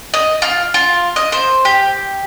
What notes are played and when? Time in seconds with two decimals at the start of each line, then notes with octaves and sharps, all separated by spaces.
0.14 D#5
0.42 F4
0.74 F4
1.16 D#5
1.32 C5
1.65 G4